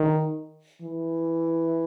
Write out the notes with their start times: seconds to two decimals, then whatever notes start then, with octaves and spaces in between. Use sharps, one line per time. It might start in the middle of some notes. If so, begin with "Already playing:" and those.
Already playing: D#3
0.82 E3